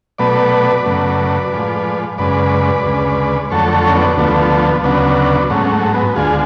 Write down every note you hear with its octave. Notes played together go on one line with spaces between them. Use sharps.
B2 F#3 A3 B4 D5
F#2 C#3 F#3 A3
A2 F3 G#3
F#2 C#3 G#3 B4 D5
D2 C#3 G#3
F2 D3 F#3 A3 A4 C#5
A4 C#5
C#4
B3 D4
D2 D3 F3 A3 B3
D2 C#3 F#3 B3 D4
G#2 F#3 A3 C#4
A3
B3
D2 D3 G#3 F4 G#4